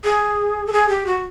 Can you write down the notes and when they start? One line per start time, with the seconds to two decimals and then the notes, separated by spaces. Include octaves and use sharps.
0.04 G#4
0.67 A4
0.73 G#4
0.89 G4
1.07 F#4